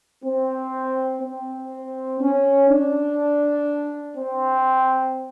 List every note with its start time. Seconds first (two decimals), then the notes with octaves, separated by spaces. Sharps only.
0.24 C4
1.22 C4
2.21 C#4
2.70 D4
4.17 C4